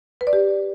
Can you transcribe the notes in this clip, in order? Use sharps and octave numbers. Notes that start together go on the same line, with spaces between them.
B4
D5
G4